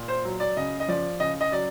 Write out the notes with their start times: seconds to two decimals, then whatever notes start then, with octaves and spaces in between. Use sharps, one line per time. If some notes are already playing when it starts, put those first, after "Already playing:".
Already playing: A#2
0.08 C5
0.25 F#3
0.40 D5
0.57 C#3 D#5
0.80 D#5
0.88 F3 D5
1.20 C#3 D#5
1.41 D#5
1.52 F#3 D5